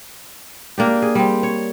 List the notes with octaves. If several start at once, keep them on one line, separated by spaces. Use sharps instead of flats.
A#3 D4 G4
G#4
G3 C4
C#5